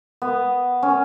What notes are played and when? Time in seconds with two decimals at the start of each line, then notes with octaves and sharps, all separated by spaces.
0.22 B3
0.83 C#4